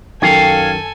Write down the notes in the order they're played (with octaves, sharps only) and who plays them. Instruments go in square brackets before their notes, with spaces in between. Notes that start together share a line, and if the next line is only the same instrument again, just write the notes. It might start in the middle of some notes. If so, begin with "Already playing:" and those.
[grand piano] F#2 D#3 [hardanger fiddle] A4 G#5 [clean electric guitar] C#5 F5 [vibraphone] G5